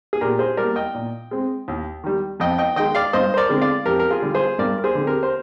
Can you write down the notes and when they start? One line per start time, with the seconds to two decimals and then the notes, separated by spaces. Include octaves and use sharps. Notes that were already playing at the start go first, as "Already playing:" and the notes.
0.13 G#4
0.21 A#2 G4 A#4
0.39 G#4 C5
0.57 G3 A#4 D5
0.63 A#3
0.76 D#5 G5
0.95 A#2
1.31 G#3 C4
1.68 D#2
2.04 D#3 G3
2.40 F2 D#5 G5
2.58 D#5 G5
2.76 D#3 G#3 D#5 G5
2.95 D5 F5
3.13 G2 C5 D#5
3.34 C5
3.37 A#4 D5
3.49 D3 G#3 C4
3.61 D5 F5
3.86 F2 G4 A#4
4.00 A#4
4.10 F4 G#4
4.22 D3 G3
4.34 G#4 C5
4.59 G2 A#4 D5
4.78 A#4
4.84 G#4 C5
4.95 D3 G#3 C4
5.07 G4 A#4
5.23 C5